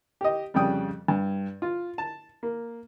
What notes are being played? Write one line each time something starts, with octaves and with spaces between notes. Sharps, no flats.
G4 D#5
F2 C#3 G3 G5 D#6
G2
F4
A5
A#3